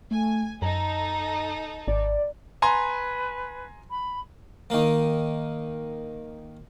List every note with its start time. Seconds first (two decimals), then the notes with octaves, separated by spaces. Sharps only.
0.11 A3 G#5
0.62 F#2 D#4 A4 A#5
1.88 G#1 D5
2.62 B4 G#5 A#5 C6
3.91 B5
4.70 D#3 A#3